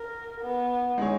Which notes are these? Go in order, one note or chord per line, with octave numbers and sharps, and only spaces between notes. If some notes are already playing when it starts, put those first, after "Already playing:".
Already playing: A#4
B3
G#3 D#4 G#4 C#5